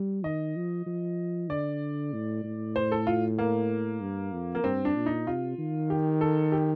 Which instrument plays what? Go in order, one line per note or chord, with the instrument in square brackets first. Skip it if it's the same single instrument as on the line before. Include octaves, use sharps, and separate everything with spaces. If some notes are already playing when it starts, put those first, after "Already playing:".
Already playing: [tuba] G3
[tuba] D#3 [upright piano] D#5
[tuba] F3
F3
[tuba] D3 [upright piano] D5
[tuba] A2
A2
[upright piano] C5
A4
F4
A#3
[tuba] G2
F2
[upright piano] A#3
[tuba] G2 [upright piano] C4
[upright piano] D4
[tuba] A#2
[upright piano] D#4
[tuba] C3 [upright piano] F4
[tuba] D#3
[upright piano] G4
A4
G4